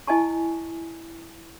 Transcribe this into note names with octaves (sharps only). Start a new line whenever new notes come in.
E4 D#5 G#5 A5 C#6